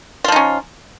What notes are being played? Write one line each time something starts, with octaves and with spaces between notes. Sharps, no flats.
F3 C#4 D#4 F4